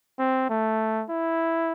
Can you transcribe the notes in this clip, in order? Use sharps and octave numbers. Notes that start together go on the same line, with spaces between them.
C4
A3
E4